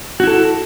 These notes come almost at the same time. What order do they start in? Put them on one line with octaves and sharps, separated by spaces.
F#4 E4 A4